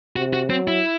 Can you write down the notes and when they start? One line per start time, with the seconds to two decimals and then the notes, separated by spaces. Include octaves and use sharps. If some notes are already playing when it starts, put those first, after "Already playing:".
0.16 C3 F#4
0.33 F#4
0.50 F#3 C4
0.68 E4